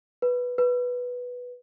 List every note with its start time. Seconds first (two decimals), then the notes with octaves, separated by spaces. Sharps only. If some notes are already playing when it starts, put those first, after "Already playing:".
0.22 B4
0.58 B4